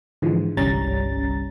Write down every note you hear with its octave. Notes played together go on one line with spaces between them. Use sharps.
G#2 D3 E3 F3 G#3
G1 C2 G3 C#4 A#5 A6